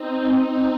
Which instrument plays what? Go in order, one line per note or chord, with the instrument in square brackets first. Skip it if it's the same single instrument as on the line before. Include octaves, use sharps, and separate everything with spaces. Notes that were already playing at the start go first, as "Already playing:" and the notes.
Already playing: [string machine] C4 D#4
C4 D#4